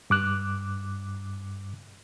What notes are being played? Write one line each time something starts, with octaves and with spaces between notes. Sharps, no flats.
G2 D6 F#6